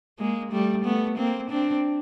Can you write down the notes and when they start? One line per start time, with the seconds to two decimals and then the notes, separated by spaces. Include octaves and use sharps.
0.19 G#3 A#3
0.52 G3 A3
0.84 A3 B3
1.17 A#3 C4
1.50 C4 D4